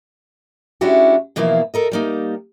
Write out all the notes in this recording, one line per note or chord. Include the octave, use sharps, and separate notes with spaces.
G#3 C#4 D4 E4 F#4 G4
B2 E3 F3 A#3 E4 F5
A4 A#4 D#5
G3 A#3 D#4